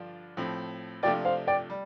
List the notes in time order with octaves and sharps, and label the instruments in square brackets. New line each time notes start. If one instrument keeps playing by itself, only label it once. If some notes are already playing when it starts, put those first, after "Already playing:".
Already playing: [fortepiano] G2 D3 F3 D4 F4
A2 F3 C4
[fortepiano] C3 F3 A3 D4 F4 [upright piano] D5 G5
[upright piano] C5 F5
D5 G5
[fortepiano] G3